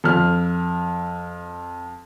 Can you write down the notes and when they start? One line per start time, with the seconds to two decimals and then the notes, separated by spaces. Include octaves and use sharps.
0.04 F2 F6